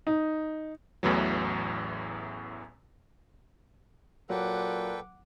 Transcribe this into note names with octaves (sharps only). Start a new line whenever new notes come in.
D#4
A1 E2 A2 E3 F#3
A#2 F#3 A4 B4 F#5 G5 D6